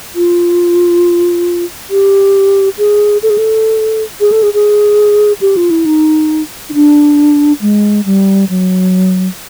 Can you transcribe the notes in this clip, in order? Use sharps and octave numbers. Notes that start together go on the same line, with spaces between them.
F4
G4
G#4
A4
G#4
A4
G#4
A4
G#4
G#4
G4
F4
E4
D#4
D#4
D4
G#3
G3
F#3